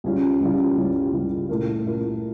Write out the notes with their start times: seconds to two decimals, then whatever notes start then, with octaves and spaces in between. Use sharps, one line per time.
0.04 C#2 C#3 G3 C#4 F4
0.41 C#2 C#3 G3 C#4 F4
0.77 C#2 C#3 G3 C#4 F4
1.13 C#2 C#3 G3 C#4 F4
1.49 A#2 A3 E4 A#4
1.85 A#2 A3 E4 A#4